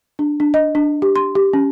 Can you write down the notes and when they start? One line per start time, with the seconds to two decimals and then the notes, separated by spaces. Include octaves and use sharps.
0.19 D4
0.40 D4
0.54 D#5
0.75 D4
1.02 G4
1.16 C6
1.35 G4
1.53 C#4